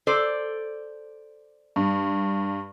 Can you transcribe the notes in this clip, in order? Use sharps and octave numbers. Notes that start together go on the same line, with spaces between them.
A4 C5 D5
G2